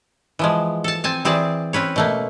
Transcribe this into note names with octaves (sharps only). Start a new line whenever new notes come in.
E3 F3 G#3
A4 A5
C4 G#5 A5
E3 C4 G#4 D5 A5
C4 C#4 B4 C#5
B2 A3 A#3